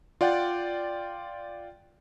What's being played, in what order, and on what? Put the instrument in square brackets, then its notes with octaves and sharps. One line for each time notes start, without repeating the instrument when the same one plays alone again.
[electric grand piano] F4 D5 F#5 G5